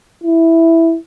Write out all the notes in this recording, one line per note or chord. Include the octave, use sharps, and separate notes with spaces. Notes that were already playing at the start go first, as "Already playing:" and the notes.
E4